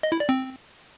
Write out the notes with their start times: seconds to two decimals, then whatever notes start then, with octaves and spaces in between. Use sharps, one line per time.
0.03 D#5
0.12 E4
0.20 D5
0.29 C4